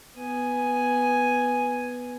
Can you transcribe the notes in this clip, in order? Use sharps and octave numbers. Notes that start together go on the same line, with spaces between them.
B3 G#5